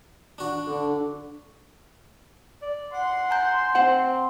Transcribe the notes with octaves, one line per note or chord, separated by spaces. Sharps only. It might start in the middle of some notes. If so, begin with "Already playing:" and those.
D4 F#4
D3
D5
F#5 C6
G#5 A#5 G6
C4 C5 F#5